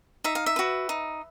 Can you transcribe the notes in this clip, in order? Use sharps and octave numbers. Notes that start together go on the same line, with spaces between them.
D#4 E5
F5
E5
F#4 B4
D#4